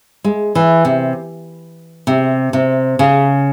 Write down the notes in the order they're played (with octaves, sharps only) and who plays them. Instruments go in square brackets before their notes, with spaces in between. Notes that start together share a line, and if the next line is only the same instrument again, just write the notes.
[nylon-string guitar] G#3
E3
C3
C3
C3
C#3